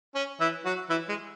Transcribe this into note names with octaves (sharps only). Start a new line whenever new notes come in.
C#4
E3 E4
F#3 F#4
E3 E4
G#3